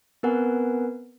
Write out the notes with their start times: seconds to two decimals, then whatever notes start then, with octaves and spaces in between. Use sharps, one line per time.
0.23 B3 C4 A#4 B4 F#5 G#5